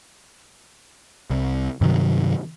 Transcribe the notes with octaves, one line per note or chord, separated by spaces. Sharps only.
C2
G2 C3 D#3 F#3